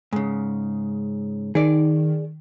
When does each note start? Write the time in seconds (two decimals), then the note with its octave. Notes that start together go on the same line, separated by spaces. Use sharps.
0.12 G#2 C#3
1.55 D#3 G#4 D5